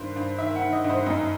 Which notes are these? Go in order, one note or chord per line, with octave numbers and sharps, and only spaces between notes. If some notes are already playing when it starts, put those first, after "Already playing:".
Already playing: G2 D#3 C5
G2
D#3 E5
F#5
D#3
D#5
G2
C5
F#2 D#4